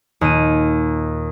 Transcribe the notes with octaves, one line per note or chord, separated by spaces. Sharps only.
D#2 A#2 D#7